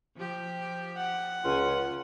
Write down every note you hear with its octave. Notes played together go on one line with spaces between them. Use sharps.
F3 G4
F#5
C#2 C#3 F4